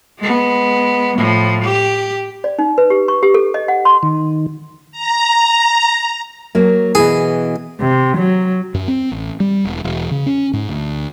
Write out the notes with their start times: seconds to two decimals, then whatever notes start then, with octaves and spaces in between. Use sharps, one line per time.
0.19 G#3 B3
1.16 A2 F3
1.63 G4
2.44 D5
2.59 D#4
2.78 B4
2.90 G4
3.08 C#6
3.23 G4
3.34 A4
3.54 D#5
3.68 F#5
3.85 C6
4.03 D#3
4.92 A#5
6.55 F#3 A#3
6.95 B2 E3 G#4
7.80 C3
8.18 F#3
8.74 F#2
8.88 C4
9.12 A1
9.40 G3
9.65 E1
9.84 E1
10.11 C#3
10.26 C#4
10.53 G#2
10.69 D2